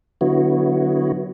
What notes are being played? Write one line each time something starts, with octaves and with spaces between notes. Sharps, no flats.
D3 F#3 B3 E4 F#4